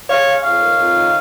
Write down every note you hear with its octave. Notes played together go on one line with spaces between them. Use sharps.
G#3 C#5 F5
G#3
F2 C#5 F5
D#3
F2
D#3